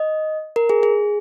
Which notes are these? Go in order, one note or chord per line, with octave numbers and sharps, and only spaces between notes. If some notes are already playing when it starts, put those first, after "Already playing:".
Already playing: D#5
A#4
G#4
G#4